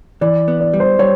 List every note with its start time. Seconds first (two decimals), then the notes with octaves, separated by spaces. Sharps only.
0.21 E3 D5
0.48 B3
0.60 D5
0.74 G3
0.80 C5
0.99 G3 C#5